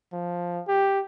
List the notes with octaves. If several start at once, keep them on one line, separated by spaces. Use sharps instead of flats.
F3
G4